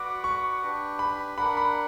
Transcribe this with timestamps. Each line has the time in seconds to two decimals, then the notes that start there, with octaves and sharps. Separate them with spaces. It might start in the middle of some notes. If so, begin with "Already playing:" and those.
Already playing: F#4 B4 D5 F#5 D6
0.24 C#6
0.62 D4 G4 B4
0.99 B5
1.38 D4 A#4 D5 F#5 B5
1.57 B5